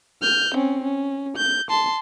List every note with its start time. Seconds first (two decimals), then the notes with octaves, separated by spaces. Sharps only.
0.22 F6 G6
0.55 C4 C#4
0.83 C#4
1.37 G6
1.70 A5 C6